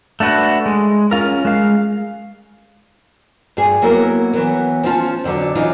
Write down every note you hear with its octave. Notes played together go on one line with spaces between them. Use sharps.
A3 D4 F#4 B4
G#3
C#4 F4 A#4
G#3 F5
G2 G#4
F#3 A#3 B3 E4 A#4
E3 F#3 B3
F3 C#4 F4 A5
F2 D3 D#3 F#3
E3 F#3 C#4 D#4 F4